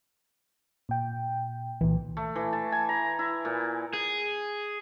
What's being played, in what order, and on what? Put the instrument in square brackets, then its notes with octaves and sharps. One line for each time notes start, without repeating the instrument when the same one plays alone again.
[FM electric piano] A#2 G5
[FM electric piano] C2 A#2 [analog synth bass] E3
[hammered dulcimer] A3
E3
A5
G#5
A#5
E4
A#2
[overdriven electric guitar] G#4